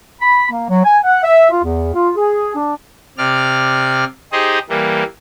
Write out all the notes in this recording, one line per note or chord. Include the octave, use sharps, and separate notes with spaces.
B5
A#3
F#3
G#5
F#5
E5
F4
E2
F4
G#4
D4
C3 D5 F6
D#4 G4 G#4 C5 D#5
E3 G3 A#3